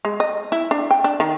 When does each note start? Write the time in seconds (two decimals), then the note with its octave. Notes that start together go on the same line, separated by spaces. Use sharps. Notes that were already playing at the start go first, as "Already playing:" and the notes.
0.05 G#3
0.20 D#5
0.52 E4
0.71 D4
0.91 G5
1.04 D4
1.20 D#3